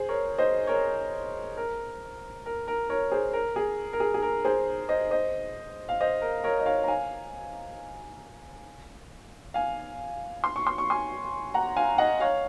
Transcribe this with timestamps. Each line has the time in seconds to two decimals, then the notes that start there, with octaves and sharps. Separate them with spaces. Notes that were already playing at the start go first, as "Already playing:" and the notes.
Already playing: G#4 C5
0.09 A#4 C#5
0.38 C5 D#5
0.67 A#4 C#5
1.57 A#4
2.46 A#4
2.68 A#4
2.89 A#4 C#5
3.12 G#4 C5
3.33 A#4
3.56 G#4
3.93 A#4
4.00 G#4
4.14 G#4
4.22 A#4
4.45 G#4 C5
4.89 C5 D#5
5.11 C5 D#5
5.89 F5
6.01 C5 D#5
6.22 A#4
6.44 A#4 C#5
6.59 D#5
6.66 C#5 F5
6.84 A#5
6.88 F5 G#5
9.54 F5 G#5
10.44 C6
10.56 C#6
10.67 C6
10.78 C#6
10.90 G#5 C6
11.54 F#5 A#5
11.77 F5 G#5
11.98 D#5 F#5
12.20 C#5 F5